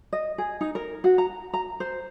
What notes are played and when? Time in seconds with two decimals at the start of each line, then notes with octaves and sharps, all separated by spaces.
0.13 D#5
0.38 G#4
0.61 D#4
0.75 A#4
1.04 F#4
1.18 A#5
1.53 A#5
1.80 C5